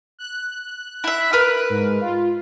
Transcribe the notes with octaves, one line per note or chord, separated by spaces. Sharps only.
F#6
E4 E5
A#4 B4 F6
G#2
F4